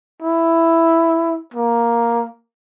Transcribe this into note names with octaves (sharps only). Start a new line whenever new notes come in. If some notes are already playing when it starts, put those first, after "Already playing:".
E4
A#3